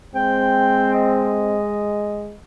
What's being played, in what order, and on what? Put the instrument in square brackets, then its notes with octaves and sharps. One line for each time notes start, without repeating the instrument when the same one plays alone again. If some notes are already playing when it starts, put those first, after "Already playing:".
[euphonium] G#3 [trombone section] C4 [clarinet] G5
[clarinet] D#5